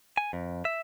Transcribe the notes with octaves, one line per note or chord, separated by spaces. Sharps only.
G#5
F2
E5